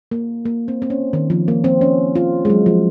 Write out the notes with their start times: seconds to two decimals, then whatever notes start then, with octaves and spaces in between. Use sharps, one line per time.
0.11 A#3
0.45 A#3
0.68 C4
0.82 C4
0.90 C#4
1.13 D#3
1.30 F3
1.48 A#3
1.64 C4
1.81 C#4
2.16 F4
2.45 G#3
2.50 F#3
2.66 F3